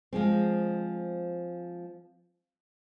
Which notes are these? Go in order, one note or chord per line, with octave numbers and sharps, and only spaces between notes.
F3 G#3 C4